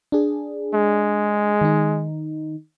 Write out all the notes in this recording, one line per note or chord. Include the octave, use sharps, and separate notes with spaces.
D4 G#4
G#3
D#3 D#4